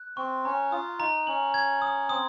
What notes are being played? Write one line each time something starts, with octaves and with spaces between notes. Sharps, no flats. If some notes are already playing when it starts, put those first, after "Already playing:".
Already playing: F#6
C4 C#6
C#4 A#5
F4 D#6
D#4 A#5
C#4 F#7
G#6
D#6
C4 D#6